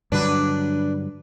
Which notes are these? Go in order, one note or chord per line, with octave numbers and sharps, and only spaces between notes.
G2 D3 F#3 D4 B4